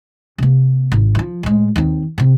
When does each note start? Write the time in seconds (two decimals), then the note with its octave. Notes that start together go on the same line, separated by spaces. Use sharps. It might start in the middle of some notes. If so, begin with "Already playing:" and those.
0.38 C3 A#3
0.92 G#1
1.15 E3 F3
1.43 A2 G#3
1.76 D#2 C4
2.18 C3 C4